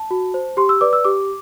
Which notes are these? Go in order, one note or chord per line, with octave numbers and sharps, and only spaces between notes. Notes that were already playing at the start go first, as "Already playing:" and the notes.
Already playing: A5
F#4
C5
G4 C6
E6
B4 D5 D6
E6
G4 D6